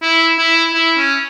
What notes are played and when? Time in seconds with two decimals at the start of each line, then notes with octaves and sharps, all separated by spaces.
0.02 E4
0.38 E4
0.73 E4
0.97 C#4